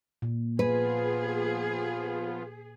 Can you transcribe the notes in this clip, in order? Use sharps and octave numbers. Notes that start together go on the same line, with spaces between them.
A#2
F3 B3 F4 G#4 B4